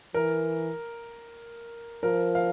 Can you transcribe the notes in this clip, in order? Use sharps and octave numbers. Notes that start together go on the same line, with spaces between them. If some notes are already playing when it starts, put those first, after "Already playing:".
E3 A#4
F3 A#4
F5